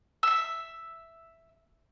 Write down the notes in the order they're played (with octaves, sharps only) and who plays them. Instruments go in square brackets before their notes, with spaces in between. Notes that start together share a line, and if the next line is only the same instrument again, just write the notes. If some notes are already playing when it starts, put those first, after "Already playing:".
[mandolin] E5 E6